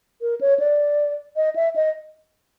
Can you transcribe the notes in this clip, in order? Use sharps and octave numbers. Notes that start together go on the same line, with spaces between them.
A#4
C#5
D5
D#5
E5
D#5